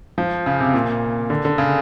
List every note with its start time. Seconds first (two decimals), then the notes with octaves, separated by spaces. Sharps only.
0.18 F3
0.46 C#3
0.60 C3
0.74 A#2
1.30 D3
1.45 D3
1.58 C#3